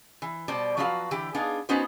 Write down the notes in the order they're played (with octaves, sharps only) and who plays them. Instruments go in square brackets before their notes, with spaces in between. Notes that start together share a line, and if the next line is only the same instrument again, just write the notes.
[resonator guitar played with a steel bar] E3
B2 G3 C5 D5 A5
F3 F#3 F#4 B4 C5 F5
D3 E3 G4
B3 D4 D#4 G#4 F5
B3 C#4 D#4 F#4 B4 C5